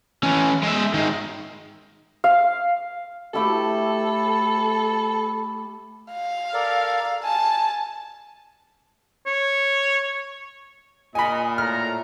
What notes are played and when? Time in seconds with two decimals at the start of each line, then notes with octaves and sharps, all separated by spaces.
0.23 E3 C#4
0.63 G#3 E5
0.94 D#3 G#3
2.24 F5
3.34 A3 E4 G4 A4
6.13 F5
6.54 A4 A#4 D5
7.23 G#5 A5
9.26 C#5
11.15 A#2 D#5 G#5 B5
11.58 A2 A#5 F6